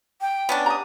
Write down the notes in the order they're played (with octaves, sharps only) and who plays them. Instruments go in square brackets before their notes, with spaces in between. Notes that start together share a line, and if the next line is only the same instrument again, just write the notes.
[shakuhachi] G5
[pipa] B3 C#4 D4
[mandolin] A#5 D#6